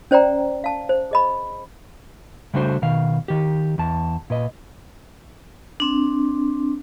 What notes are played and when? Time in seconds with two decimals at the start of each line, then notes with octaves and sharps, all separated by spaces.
0.11 C#4 C5 D5 G5 A#5
0.64 F5 A5
0.89 C5
1.11 G#4 D#5 B5
2.54 C#3 G3 A3 D4 F#4 C5
2.82 B2 D#3 F5
3.28 D#3 G4
3.78 E2 A5
4.30 A#2 B4 D#5
5.80 C4 D4